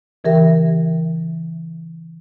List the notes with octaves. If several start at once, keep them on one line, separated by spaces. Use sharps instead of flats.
C#3 E3 G4 A#4 E5 G5